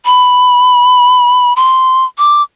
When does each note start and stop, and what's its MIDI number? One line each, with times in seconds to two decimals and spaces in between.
0.05 1.53 83
1.56 2.04 84
2.18 2.42 86